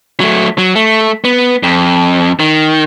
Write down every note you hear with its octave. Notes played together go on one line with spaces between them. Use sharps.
F#3 A3
F#3
A3
B3
F2
D#3